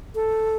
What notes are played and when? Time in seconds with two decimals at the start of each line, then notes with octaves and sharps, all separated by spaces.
0.15 A4